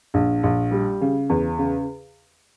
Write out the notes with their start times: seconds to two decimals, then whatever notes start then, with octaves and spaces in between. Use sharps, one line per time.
0.14 A#1
0.43 A#1
0.71 G3
1.01 C#3
1.30 E2
1.59 C#3